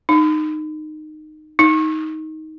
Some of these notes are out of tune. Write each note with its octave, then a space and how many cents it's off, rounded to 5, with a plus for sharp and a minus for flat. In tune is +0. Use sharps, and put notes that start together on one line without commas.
D#4 -20
D#4 +15